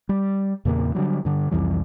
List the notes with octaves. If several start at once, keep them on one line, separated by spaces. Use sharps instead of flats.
G3
E2 A#2 C#3 A#3
D3 F#3 G3
G2 D3
C2 F2 E3 G3